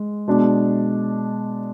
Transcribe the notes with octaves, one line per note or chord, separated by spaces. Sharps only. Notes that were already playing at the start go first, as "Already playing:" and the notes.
Already playing: G#3
B2 G#3 D4